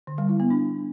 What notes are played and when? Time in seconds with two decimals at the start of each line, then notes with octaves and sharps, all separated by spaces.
0.07 D3
0.18 G3
0.29 E4
0.40 B3
0.50 D4